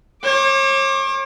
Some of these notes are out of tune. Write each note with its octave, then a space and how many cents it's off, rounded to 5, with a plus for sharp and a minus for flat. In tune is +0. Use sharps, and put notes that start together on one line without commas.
C#5 -40 D6 +0